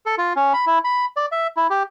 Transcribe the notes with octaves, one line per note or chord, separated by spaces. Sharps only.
A4
F4
C#4
B5
E4
B5
D5
E5
E4
G4